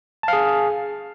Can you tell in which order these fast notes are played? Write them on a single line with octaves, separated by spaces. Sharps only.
A5 F5 G#4